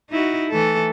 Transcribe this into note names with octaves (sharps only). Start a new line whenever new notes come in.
D#4 E4 F#4
E3 A3 A4